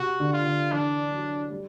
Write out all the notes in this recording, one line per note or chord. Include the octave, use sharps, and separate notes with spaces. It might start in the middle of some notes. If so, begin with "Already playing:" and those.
Already playing: C3 F#4
D3
F4
D3
E3 D4
F#3
G3